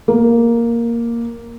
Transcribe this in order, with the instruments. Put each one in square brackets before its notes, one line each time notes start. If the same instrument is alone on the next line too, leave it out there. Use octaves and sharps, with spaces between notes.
[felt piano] A#3